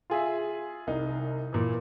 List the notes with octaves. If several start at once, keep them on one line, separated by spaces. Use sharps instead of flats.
F4 G#4 E5
C2 D#4
A#2 E3